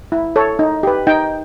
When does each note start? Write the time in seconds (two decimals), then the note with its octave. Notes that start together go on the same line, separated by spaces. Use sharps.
0.12 E4
0.36 A4 C#5
0.59 D#4
0.83 G4 B4
1.07 D#4 G5